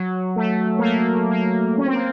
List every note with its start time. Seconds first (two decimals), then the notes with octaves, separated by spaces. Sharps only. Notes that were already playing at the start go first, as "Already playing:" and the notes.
Already playing: F#3
0.36 A3
0.79 A#3
0.83 A3
1.30 A#3
1.78 C#4
1.85 C4
1.94 A#3